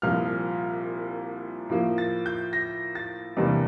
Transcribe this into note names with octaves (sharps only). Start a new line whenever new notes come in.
C2 A#2 F3 F6
A2 F3 A#3
A6
G6
A#6
A6
E2 C3 G3 A#3 D4